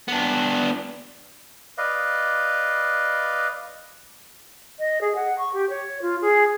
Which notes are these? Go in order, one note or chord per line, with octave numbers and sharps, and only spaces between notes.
B3 D4
B4 D5 D#5 F5
D#5
G#4
F#5
C#6
G4
C#5
F4
G#4